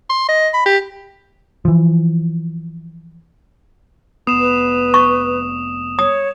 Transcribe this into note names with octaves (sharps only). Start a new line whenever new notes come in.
C6
D#5
B5
G4
E3 F3
F1 B3 D#6 E7
B4
C#6
C#5 D#6